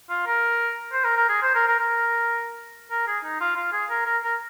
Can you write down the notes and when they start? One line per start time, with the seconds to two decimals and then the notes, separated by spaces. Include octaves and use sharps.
0.10 F4
0.26 A#4
0.92 C5
1.04 A#4
1.17 A#4
1.29 G#4
1.42 C5
1.55 A#4
1.67 A#4
1.79 A#4
2.91 A#4
3.07 G#4
3.24 D#4
3.41 F4
3.56 F4
3.72 G#4
3.90 A#4
4.06 A#4
4.23 A#4